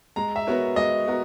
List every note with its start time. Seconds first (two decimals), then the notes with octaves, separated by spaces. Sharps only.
0.16 G#3 A#5
0.36 E5
0.47 B3 F#4 A#4 C#5
0.76 G#3 D#5
1.06 B3 F#4 A#4